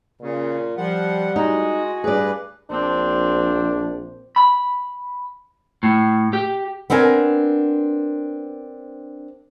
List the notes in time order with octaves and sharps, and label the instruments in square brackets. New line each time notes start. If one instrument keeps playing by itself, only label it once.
[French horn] A#2 [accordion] C#3
[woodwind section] F3 [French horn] G3 [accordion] F#5
[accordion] G#3 [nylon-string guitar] D#4 [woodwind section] F#4 D#5 G#5
[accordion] G2 B4 [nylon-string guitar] G#4 D5
[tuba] A#1 [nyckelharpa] C4 [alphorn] D4
[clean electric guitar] B5
A2
G4
[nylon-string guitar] B3 C4 D4 A#4 G#5